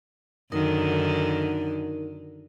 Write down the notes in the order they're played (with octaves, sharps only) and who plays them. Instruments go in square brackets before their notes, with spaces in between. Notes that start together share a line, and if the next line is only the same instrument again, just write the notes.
[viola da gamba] F#2 D3 D#3 [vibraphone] D#4 A#4